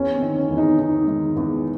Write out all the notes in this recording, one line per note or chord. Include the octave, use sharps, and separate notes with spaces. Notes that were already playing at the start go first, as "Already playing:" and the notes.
Already playing: E2 C#4
C4
D#3
C#4
E2
D#4
D#3 D#4
G#3
E2